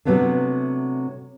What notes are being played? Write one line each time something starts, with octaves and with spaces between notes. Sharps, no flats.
C3 F#3 A3 B3 C4 D4